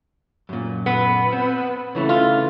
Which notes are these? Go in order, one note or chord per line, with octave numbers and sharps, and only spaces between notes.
F#2 A#2
B3
C4
C#3 E3 A3
F4